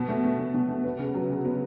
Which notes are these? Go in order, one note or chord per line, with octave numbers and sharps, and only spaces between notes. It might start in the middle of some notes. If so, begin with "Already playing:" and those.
Already playing: B2
A3
A3
B2
B2
A3
B3
C#3
F#3
C#3
B3